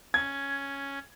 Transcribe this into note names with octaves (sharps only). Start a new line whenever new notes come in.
C#4 G#6